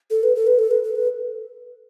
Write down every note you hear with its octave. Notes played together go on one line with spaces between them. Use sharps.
A4
B4
A4
B4
A4
B4
A4
B4